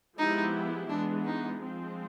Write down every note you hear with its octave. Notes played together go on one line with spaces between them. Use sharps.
F3 G#3 B3 D#4 E4 G4
E3 G#3 B3 D4
D#4
F3 G#3 C4